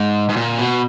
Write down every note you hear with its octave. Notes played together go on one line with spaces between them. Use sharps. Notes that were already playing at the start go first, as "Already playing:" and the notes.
Already playing: G#2
G#2
A#2
B2